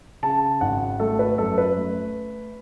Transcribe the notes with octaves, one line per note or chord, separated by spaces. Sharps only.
C#3 A5
G#1 F#5
A3 A4
B4
F#2 A4
B4
A3